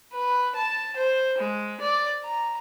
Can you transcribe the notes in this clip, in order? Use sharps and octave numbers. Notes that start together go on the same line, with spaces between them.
B4
A5
C5
G#3
D5
A#5